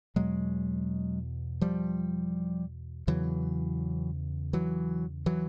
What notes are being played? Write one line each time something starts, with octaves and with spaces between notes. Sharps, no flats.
E2 B2 F#3 G#3
F3 G3
E2 C#3 E3 F#3
E3 F#3
E3 F#3